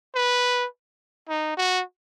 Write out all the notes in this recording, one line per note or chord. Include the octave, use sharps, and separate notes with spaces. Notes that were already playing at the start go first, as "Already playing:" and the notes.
B4
D#4
F#4